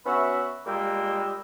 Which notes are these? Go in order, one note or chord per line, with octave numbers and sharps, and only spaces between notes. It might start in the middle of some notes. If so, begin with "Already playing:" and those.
B3 C#4 F#4 B4 E5
A#2 G3 G#3 A#3 G5 E6